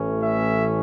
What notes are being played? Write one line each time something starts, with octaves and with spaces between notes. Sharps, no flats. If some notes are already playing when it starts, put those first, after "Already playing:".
Already playing: A1 A2 E3 A3 C#4
E5